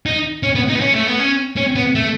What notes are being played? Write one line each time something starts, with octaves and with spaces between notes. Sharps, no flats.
D#4
C#4
B3
D#4
B3
C#4
A3
B3
C#4
C#4
B3
A3